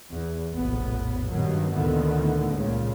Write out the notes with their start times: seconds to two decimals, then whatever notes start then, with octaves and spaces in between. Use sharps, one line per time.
0.12 E2
0.52 F1 A#1 A2 B3
1.29 G2 B2 D#3 F#3
1.73 D2 A#2 D3 D#3 A3 B3
2.54 C#2 A#2 C#3